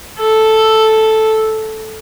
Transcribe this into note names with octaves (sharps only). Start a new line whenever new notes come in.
A4